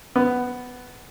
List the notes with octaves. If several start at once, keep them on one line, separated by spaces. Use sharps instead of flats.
B3